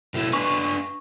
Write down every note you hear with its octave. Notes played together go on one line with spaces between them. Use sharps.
B2 A3 E4
D4 B4 G#5 C#6